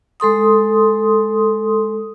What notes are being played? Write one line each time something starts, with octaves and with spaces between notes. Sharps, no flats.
G#3 A4 C6 D#6